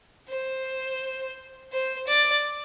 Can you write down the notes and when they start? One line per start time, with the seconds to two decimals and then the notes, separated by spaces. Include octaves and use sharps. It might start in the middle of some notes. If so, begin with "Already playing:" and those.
0.29 C5
1.72 C5
2.08 D5